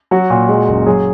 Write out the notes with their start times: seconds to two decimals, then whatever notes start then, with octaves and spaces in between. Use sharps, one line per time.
0.11 F#3 F#4
0.30 A#2
0.49 G#3
0.68 F#1
0.86 F#3 G#4